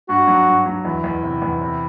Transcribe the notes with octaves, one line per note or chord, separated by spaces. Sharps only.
G2 F#4
F#3
G2
F#3
E2 E4
E2
C3
E2
C3